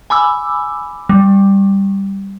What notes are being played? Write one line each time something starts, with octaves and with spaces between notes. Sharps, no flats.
G#5 B5 D6 E6
G3